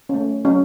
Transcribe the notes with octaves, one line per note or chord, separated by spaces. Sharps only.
A3 C#4
F#3 C#4